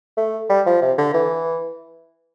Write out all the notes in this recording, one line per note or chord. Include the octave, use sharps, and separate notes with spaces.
A3
G3
F3
C3
D3
E3